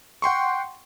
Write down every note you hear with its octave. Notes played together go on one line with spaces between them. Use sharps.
F#5 G5 C6 C#6